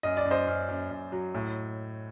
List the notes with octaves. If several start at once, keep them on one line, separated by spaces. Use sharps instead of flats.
F#2 D#5
D5
F#2
C5 D#5
F#2
F#2
F#2
F#3
A2